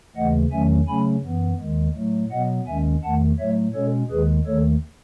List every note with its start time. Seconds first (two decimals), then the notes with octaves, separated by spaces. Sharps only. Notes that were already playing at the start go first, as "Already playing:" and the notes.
0.16 D#2 C#3 E3 A3 D#5 F#5
0.52 E2 D#3 F#3 A3 C#4 E5 G#5
0.87 C#3 F#3 A3 C#4 G#5 B5
1.23 F#2 E3 B3
1.60 D#2 D#3 G#3
1.96 A2 F#3 A3
2.31 B2 F#3 B3 D#5 F#5
2.67 D#2 D#3 G#3 C#4 E5 G#5
3.03 E2 D#3 A3 F#5 A5
3.39 A2 F#3 A3 C#5 E5
3.74 B2 G#3 C#4 A4 C#5
4.11 D#2 D#3 G#3 G#4 B4
4.46 D#2 D#3 A3 A4 C#5